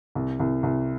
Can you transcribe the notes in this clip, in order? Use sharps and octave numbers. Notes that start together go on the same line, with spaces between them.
C2
C2
C2